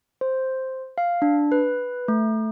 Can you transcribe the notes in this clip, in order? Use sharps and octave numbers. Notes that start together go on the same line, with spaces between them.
C5
F5
D4
B4
A3